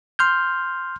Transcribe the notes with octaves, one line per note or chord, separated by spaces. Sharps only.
C6 F6 G6